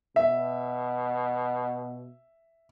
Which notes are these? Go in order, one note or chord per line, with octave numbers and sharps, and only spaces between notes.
B2 E5